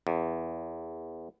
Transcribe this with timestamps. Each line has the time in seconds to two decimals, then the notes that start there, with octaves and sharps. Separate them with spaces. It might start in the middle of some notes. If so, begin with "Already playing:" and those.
0.07 E2